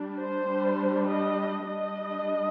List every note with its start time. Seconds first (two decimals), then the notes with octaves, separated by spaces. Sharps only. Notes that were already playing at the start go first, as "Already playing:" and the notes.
Already playing: G3 D4
0.19 C5
0.49 G3 D4
1.08 D#5
1.67 G3 D4 D#5